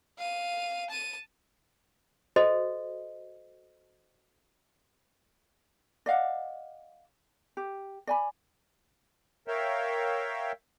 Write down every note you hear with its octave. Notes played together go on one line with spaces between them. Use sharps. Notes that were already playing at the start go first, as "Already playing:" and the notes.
F5 D#7
A5 D#7
F#4 A4 C5 D#5
D5 D#5 F5 F#5
G4
D5 G#5 B5
A#4 C#5 E5 F5 G5